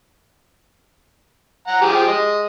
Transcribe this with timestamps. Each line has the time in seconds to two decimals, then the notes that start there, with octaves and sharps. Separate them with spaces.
1.67 F#5 A#5
1.81 F3 G4 G#4
2.08 G#3 D#5